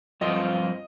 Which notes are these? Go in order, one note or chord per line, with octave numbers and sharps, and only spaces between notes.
G2 F3 C4 F4 D#5